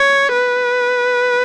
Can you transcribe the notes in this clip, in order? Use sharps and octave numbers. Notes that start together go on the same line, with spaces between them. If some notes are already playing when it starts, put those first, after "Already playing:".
Already playing: C#5
B4